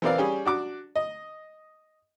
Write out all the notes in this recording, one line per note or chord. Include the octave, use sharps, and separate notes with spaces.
E3 B3 C4 A#4 D5 F5
G3 C#4 G4 G#4
D4 F#4 D6
D#5